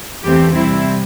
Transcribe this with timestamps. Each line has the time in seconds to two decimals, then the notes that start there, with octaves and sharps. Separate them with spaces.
0.23 E2 E3 A3 C4 G4
0.54 C3 G3 C4 E4